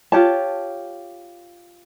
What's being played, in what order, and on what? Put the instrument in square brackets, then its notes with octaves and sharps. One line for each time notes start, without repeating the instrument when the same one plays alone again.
[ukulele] F4 G4 C#5 A5